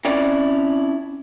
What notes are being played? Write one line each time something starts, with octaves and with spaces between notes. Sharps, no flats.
C4 C#4 E4 C#5 D5